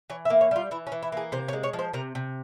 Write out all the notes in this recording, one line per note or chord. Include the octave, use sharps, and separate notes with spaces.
E3 C#5
E5
A#3
C#5
G3 F4
E3 E4
C#4
E3
E4
A#3 G#4
C3 C5
C#5
G#3
C#5
F3
C5
C3 A#4
C3